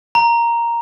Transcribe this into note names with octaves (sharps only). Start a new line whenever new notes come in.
A#5